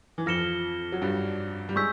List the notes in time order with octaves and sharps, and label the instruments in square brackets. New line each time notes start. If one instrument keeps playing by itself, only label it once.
[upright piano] E3
[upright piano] F2 F3 [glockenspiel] F6 A#6 C#7 E7 G7
[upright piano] F#3
G2 G3
G3
[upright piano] G#3 [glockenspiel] C#6 E6 G6 B6